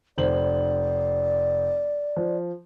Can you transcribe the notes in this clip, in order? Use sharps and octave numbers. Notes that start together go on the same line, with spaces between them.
F1 C5 D5 F#7
F3